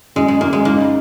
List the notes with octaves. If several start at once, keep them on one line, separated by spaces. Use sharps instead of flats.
F#2 G#3
G#3
F#2 A#3
G#3
A#3 D#4